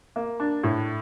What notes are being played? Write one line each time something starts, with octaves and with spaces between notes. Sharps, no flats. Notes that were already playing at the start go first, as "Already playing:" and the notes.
A#3
D4
A2